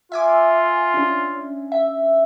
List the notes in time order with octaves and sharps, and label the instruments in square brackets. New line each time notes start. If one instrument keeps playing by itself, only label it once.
[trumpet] F4 [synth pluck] E5 G#5 D6
[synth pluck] C#4 D4
E5